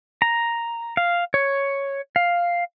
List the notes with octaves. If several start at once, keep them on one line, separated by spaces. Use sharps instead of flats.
A#5
F5
C#5
F5